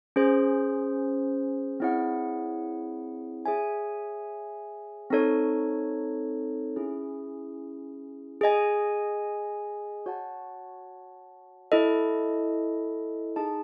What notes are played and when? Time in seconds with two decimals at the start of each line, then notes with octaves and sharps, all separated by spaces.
0.16 C#4 G#4 C5
1.80 C4 E4 G#4 C#5 F#5
3.46 G#4 C#5 E5 G#5
5.10 C4 D#4 A4 C#5
6.76 C#4 E4 G#4
8.41 G#4 D#5 G#5
10.06 F#4 C#5 F#5 A5
11.72 E4 A4 D#5
13.36 D#4 G#4 D#5 A5